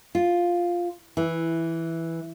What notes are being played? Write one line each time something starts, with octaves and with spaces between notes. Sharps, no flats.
F4
E3